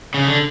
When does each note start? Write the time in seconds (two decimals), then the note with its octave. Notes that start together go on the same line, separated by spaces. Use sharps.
0.14 C#3
0.26 D3